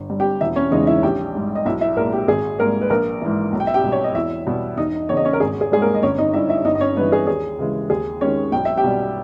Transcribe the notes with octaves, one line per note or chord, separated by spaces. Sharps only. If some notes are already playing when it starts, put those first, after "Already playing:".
Already playing: G1
G2 G3
G4 G5
E1 E4 E5
C#4 C#5
E2 C#3 E3 G#3 D#4 D#5
E4 E5
A#1 G4 G5
G#2 G3
D#5
B1 E4 E5
E4 E5
A#2 G#3 A#3 A#4
G4
G#1 G#4
G#2 G3 A#3 A#4
B4
A#1 A#3 A#4
G#2 E3
B1
G5
E5
G4 G5
B2 G3
C#5
D#5
E2 E4 E5
B2 G3
E1 D#4 D#5
E2 C#3 C#5
D#5
C#4 C#5
A#4
G#1 G#4
G#4
G#2 G3 G#4
A#3 A#4
D#5
G1 C#4 C#5
D#4 D#5
G2 G3 E4 E5
E4 E5
G1 D#4 D#5
D#5
C#4 C#5
G2 E3 B3 B4
G#4
D#2 G#4
C#3 E3 G#3
D#2 G#4
D#3 G#3 C#4 C#5
B1 G5
E5
G4 G5
B2 G3